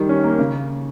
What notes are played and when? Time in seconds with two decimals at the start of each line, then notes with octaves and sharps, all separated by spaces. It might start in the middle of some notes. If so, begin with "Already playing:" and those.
Already playing: D#3 G3
0.09 C#4
0.23 A#3
0.39 C#3